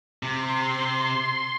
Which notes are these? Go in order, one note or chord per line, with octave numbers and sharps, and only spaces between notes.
C3 C6